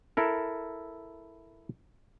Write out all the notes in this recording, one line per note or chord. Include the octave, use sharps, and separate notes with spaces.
E4 A4 A#4